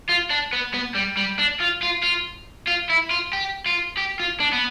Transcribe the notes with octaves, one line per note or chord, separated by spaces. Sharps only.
F4
D4
B3
B3
G3
G3
D4
F4
F4
F4
F4
E4
F4
G4
F4
G4
F4
D4
B3